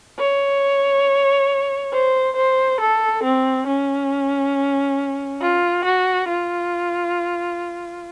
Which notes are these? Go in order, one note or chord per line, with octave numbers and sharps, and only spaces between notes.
C#5
C5
C5
A4
C4
C#4
F4
F#4
F4